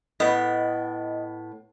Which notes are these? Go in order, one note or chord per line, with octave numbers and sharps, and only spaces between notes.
A2 B3 D#5